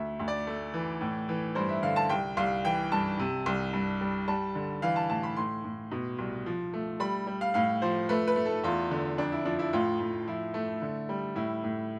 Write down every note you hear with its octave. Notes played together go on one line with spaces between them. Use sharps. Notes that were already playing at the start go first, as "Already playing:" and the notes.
Already playing: D2 E5
D2
D5
A3
E3
A2
E3
G2 C5
E5
D3 F5
A5
C2 G5
C2 F5
E3 G5
G2 A5
C3
C2
G2
G3
G3 A5
D3
E3 F5
A5
A2 A5
B5
A2 C6
A2
B2
C2
F3
A3
G3 B5
G3
F5
A2 F5
F3 C5
A3 B4
B4
A3
A4
E2 F4
D3
F2 D4
E4
F3 D4
E4
A2 F4
A2
F3 E4
A3
D3
G3
A2 E4
A2